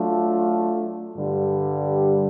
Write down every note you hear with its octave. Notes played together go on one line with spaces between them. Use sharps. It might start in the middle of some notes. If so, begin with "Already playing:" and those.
Already playing: F#3 A3 D4 F4
G2 D3 G3